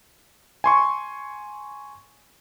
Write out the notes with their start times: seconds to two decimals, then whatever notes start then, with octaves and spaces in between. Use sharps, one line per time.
0.64 G#5 C6 C#6